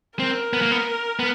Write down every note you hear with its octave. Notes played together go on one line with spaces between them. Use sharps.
C4 A#4
B3
A#3
B3
B3